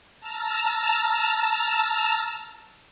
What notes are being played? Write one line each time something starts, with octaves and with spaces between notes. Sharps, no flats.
A5 A#5 E6 F6